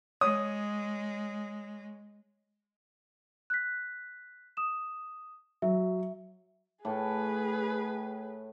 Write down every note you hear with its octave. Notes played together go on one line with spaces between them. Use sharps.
G#3 C#5 D#6
F#6 B6
D#6 E7
F#3 E5
A2 G#4 B4